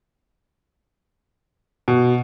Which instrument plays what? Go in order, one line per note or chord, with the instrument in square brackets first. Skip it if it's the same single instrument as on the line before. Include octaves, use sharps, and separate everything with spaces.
[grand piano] B2